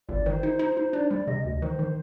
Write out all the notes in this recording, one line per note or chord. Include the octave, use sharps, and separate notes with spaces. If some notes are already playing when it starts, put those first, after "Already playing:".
G1 D5
D#3 C5
D#4
D#4
D#4
D4 D5
C5
G3 D5
C3 D#5
D2 D#5
D#3 C5
D#3